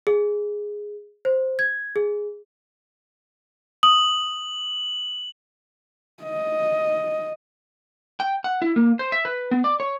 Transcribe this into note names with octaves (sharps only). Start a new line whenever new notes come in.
G#4
C5
G#6
G#4
D#6 F#7
D#5
G5
F#5
E4
A#3
C5
E5
B4
B3
D5
C#5